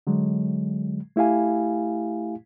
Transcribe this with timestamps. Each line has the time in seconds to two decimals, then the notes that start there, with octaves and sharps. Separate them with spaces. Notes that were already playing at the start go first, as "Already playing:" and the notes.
0.07 D3 F#3 G#3
1.16 A3 E4 G4 F5 G#5